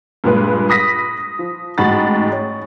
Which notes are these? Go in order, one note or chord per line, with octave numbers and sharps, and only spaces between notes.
G2 A#2 G#3 B4
B5 D#6 A#6 B6
F3
A1 G#2 F#4 B5 A6
C#5